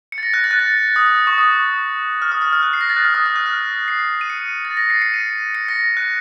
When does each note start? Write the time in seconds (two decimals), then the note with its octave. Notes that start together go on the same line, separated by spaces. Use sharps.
0.12 C#7
0.18 A6
0.23 A#6
0.34 F#6
0.44 A6
0.51 F#6
0.59 A6
0.96 D#6
1.06 D#6
1.27 C#6
1.38 D#6
2.22 F6
2.32 D#6
2.42 D#6
2.52 F6
2.63 F#6
2.73 C7
2.81 A#6
2.90 A6
2.97 F#6
3.05 F6
3.14 D#6
3.26 D#6
3.36 F#6
3.46 F6
3.88 C7
4.21 D#7
4.30 C#7
4.65 A6
4.77 A#6
4.90 C7
5.02 C#7
5.14 D#7
5.55 C#7
5.69 A#6
5.97 F#6